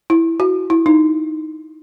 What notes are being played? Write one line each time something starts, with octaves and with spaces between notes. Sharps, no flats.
E4
F#4
E4
D#4